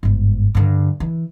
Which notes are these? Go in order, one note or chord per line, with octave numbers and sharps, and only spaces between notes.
G1 G#2
G2 D3
E3